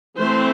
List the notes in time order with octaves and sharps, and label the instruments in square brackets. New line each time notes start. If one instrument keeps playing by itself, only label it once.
[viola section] E3 A3 C4 C5